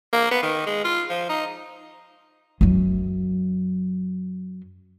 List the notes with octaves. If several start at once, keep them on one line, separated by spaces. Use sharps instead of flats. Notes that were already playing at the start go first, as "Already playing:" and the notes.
A#3
B3
D#3
G#3
F4
F3
D#4
F#2 F#3